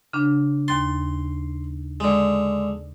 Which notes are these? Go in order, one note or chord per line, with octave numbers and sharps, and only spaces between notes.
C#3 D4
D#2 C6 A6
D3 G#3